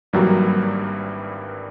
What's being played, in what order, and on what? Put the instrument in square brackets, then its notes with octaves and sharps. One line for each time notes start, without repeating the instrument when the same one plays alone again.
[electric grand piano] G#1 G2 E3 G3 A#3 [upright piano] F#3